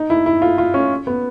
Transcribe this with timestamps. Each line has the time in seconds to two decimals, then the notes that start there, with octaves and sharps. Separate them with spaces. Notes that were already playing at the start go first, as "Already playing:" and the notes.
Already playing: D#4
0.10 E4
0.26 E4
0.42 F4
0.58 F4
0.74 C#4
1.07 B3